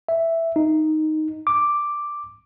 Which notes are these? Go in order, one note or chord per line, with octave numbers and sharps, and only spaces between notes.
E5
D#4
D6